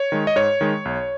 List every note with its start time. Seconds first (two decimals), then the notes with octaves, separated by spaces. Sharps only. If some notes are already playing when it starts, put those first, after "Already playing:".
Already playing: C#5
0.12 D#3 G#3
0.27 D#5
0.36 G#2 C#5
0.61 D#3 G#3
0.85 B1